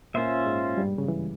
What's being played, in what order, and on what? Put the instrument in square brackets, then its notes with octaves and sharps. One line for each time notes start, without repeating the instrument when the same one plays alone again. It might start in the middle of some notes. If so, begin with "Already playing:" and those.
[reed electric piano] A#2 A#3 [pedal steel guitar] C#4 F4 C5 E5
[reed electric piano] G#2 G#3
G2 G3
C#3
E3